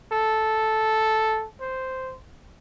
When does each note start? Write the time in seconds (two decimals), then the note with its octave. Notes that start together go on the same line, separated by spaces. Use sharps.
0.12 A4
1.60 C5